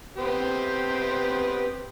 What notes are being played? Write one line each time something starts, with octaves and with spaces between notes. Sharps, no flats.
B3 C4 G4